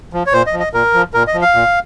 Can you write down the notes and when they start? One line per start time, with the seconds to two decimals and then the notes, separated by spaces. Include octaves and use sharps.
0.13 F3
0.26 C#5
0.32 A#2 C5
0.46 D#5
0.53 F3
0.59 D#5
0.73 A#2 A#4
0.94 F3
1.14 A#2 A#4
1.27 D#5
1.34 F3
1.41 F5
1.54 A#2